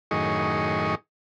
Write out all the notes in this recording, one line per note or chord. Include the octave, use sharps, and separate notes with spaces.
F#2 A2 D#3 G#4 D#5 C#6